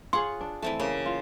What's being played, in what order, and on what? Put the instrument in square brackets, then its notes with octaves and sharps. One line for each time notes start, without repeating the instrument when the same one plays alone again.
[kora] F4 G#4 C#5 [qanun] F#5 [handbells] C6
[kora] D4
[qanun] E3 C4 A5 [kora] A3
[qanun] C#3 [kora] A#3
[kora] F4